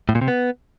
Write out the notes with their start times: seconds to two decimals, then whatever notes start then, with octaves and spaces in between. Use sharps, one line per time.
0.09 A2
0.15 A#2
0.21 C3
0.28 B3